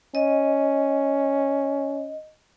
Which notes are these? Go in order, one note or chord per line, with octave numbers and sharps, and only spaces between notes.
C#4 D#5